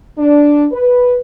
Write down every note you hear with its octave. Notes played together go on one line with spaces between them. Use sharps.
D4
B4